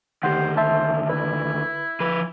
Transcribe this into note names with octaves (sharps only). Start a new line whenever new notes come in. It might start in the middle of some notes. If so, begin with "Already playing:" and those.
D2 D#3 G4 C5 F#5
C5 E5 A5
E4 B4
F3 B4